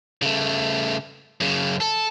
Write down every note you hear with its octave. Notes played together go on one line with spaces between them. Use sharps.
C#3 A3
F#2 C#3
A4